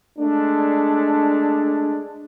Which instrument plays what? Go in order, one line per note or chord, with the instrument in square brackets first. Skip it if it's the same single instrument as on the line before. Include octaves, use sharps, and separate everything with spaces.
[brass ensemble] G#3 A3 D4